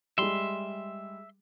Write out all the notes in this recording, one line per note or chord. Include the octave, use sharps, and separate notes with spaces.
G3 G#3 E5 C6